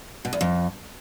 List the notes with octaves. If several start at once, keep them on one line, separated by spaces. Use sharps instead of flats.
B2
E2
F2